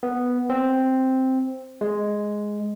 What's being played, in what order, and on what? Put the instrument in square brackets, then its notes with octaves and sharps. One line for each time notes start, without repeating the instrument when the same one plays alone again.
[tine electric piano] B3
C4
G#3